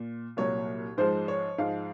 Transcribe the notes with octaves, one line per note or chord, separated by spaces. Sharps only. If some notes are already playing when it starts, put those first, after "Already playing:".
Already playing: A#2
C2 A#2 F#3 C#5
G#2 F3 G#3 C5
C#5
G#2 F3 G#3 F5